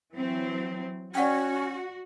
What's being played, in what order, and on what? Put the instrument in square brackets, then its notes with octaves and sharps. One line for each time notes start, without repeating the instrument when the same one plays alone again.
[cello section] E3 F#3 C4
[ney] C#4 [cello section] F#4 [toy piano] D5 F#5 G5